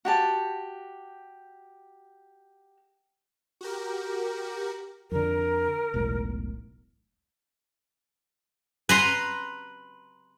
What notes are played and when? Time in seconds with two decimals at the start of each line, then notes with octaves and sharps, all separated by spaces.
0.05 F#4 G4 A5
3.61 F#4 G4 A#4
5.12 F2 D3 A#4
5.94 E1 B1 A2
8.89 B4 A#5 C6